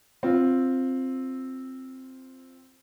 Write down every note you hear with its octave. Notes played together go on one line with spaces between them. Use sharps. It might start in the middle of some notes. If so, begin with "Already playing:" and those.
C4 F4